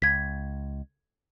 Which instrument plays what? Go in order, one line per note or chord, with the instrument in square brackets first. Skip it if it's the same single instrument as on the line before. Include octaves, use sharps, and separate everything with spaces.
[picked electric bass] C#2 [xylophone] G#6 B6